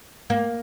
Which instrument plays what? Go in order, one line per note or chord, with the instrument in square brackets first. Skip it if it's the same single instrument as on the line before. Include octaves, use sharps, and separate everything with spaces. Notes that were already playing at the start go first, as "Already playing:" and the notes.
[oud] A#3